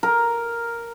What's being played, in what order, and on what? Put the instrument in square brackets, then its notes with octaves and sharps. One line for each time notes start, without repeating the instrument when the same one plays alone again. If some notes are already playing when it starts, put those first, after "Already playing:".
[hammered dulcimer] A#4